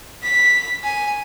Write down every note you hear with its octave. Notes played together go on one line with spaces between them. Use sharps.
B6
G#5